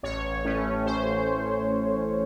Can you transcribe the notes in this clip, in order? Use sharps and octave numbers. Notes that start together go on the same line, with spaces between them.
A1 C#5
A2 A3 C#4
A1 C5